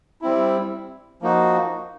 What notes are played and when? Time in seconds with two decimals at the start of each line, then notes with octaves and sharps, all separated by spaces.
0.22 G3 C4 E4
1.22 F3 A#3 D#4 F#4